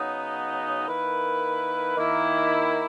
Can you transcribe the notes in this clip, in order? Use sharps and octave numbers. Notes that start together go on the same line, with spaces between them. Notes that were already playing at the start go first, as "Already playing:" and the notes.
Already playing: C#3 F#3 B3 D#4
D#3 A#3 E4 B4
D#3 A#3 E4